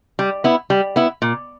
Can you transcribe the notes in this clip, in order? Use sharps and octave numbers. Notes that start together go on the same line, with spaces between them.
G3
B3 E4
G3
B3 E4
A#2